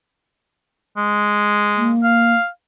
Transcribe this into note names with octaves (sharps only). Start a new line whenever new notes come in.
G#3
A#3
F5